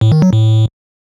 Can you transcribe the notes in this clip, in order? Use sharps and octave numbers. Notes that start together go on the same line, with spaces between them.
A2
D#3
F#3
A2